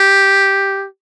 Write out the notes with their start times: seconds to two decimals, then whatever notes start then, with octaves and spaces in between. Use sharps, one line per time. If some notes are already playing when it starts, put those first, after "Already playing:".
Already playing: G4